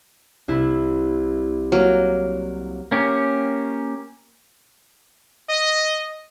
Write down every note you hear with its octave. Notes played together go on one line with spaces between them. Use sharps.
C2 E4
F#3 A#3 F6
A#3 C#4 G4
D#5